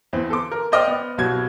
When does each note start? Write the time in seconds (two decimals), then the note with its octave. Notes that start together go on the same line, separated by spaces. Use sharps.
0.13 E2 E3 C4
0.30 A4 C6 D6
0.52 A#4
0.72 C5 D5 D#5 G5 D6 F6
0.88 B3
1.18 C2 B2 F#3 G#6